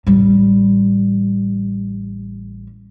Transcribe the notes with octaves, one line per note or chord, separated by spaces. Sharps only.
A1 G3